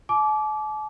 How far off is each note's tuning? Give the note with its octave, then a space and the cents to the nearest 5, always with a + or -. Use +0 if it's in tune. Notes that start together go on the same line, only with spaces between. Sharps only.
A5 -45 D6 -10